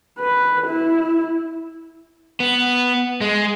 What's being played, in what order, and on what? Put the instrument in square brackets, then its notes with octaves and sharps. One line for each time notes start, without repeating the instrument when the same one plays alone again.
[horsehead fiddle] B4
E4
[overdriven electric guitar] B3
G#3